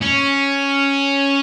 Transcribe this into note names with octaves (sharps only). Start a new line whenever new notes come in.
C#4